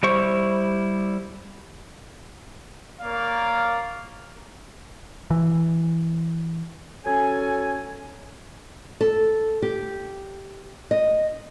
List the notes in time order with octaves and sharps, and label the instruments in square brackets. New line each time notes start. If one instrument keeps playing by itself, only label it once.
[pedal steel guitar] G3 E4 C5 C#6
[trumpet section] A#3 A#4 C#5 D5 F5
[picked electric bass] E3
[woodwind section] F#3 C#4 A4 G#5
[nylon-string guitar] A4
G4
D#5